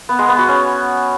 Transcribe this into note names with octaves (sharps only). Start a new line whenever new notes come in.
B3
G#3
B3
F#4
C#4